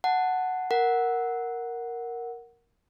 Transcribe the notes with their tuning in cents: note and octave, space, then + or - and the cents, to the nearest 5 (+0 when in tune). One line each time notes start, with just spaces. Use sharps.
F#5 +0 A5 +5
A#4 +0 F#5 +0